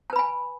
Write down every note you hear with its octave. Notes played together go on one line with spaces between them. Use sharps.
B4 G#5 A5 B5